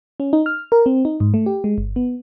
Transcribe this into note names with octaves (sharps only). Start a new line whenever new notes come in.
C#4
D#4
F6
A#4
C4
D#4
G#2
A3
G4
G#3
G1
B3